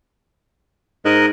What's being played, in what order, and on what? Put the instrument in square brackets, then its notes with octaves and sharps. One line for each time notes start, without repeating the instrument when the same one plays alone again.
[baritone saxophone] G#2 [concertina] A#4 D#5 F#6